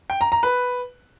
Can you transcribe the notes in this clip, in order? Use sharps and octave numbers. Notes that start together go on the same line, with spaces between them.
G5
A#5
A#5
B4